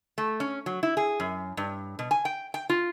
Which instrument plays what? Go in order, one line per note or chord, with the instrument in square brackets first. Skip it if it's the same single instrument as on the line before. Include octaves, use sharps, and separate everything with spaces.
[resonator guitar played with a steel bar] A3
C#4
F#3
E4
G#4
F#2
G2
B2
G#5
G5
G5
F4